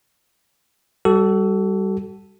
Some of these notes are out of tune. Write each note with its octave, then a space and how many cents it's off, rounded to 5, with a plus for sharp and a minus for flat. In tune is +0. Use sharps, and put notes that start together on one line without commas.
G3 +0 F#4 +40 A4 +0